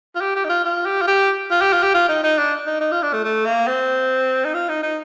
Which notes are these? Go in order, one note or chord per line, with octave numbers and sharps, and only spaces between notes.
F4
G4
G4
D#4
F4
F4
G4
F4
G4
F4
G4
F4
G4
F4
D#4
D#4
D4
D#4
D#4
F4
D4
A3
A3
A#3
C4
D#4
F4
D#4
D#4